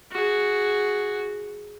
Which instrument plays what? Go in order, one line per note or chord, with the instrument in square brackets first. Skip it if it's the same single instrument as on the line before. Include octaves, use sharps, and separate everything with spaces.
[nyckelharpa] F#4 G#4